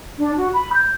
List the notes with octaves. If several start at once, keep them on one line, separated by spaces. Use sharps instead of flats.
D4
F#4
B5
G6